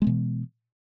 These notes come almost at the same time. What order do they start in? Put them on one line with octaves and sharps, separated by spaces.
G#3 B3 B2 E3